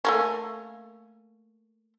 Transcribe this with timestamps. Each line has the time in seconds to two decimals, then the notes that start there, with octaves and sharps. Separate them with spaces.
0.05 A3 A#3 C#4